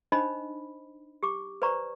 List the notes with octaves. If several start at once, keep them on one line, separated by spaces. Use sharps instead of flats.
D4 D#4 C5 D#5 B5
G4 D6
B4 C5 D5 A#5 C#6